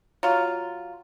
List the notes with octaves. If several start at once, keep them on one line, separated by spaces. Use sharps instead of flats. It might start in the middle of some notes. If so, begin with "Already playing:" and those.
F#3 F4